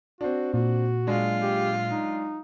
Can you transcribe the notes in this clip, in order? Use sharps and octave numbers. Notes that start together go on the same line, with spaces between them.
C4 D4 F#4
A#2 F#4
F#3 G#3 D4 F4
G4
D#4